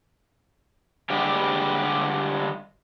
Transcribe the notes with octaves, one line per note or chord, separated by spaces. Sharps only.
D3 G3 G#3 G4